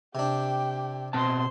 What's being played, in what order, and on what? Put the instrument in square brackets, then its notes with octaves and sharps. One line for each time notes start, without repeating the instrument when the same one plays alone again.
[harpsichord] C3 D4 [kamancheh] G4 G5
[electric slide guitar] B2 C4 A5 [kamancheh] C5 C6